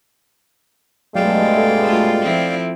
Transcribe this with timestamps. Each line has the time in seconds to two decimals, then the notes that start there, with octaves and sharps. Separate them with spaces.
1.15 G2 B2 F#3 G#3 A3 D5 F5 G5
1.54 A4 E5
1.83 A3 F4
2.22 F3 C4 E4